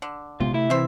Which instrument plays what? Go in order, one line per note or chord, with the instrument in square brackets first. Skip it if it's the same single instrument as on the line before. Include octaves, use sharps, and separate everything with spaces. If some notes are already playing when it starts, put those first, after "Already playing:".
[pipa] D3
[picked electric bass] A#1 G#3 B3 [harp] C3 [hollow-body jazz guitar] F4
[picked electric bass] A3 [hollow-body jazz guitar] E4
[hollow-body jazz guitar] E3 [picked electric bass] C4 [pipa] C5 E5